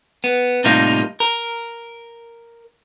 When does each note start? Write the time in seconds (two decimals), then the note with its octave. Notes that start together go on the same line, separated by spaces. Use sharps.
0.24 B3
0.64 A2 C3 G3 A#3 D#4 F4
1.20 A#4